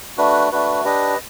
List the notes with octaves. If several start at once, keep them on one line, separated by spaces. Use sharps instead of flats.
A3 D4 F#4 B4
A3 D4 F#4 B4
D4 G4 B4 D#5